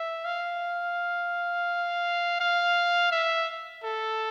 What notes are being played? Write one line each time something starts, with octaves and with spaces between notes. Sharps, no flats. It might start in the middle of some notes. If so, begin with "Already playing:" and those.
Already playing: E5
F5
F5
E5
A4